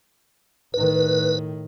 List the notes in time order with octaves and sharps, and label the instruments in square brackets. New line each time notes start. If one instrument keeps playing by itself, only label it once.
[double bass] A2 D#3 [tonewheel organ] B4